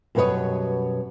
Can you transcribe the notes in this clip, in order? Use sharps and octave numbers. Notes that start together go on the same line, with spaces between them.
F#2 B2 G3 B4 C#5 D#5